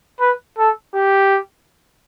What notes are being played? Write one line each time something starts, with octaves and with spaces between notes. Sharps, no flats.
B4
A4
G4